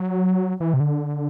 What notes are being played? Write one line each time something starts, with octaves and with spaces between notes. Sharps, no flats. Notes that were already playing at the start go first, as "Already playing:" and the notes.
Already playing: F#3
E3
C3
D3